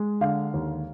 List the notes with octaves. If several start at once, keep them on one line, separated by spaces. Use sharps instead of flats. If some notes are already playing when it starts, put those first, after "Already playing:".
Already playing: G#3
D3 F5
D#2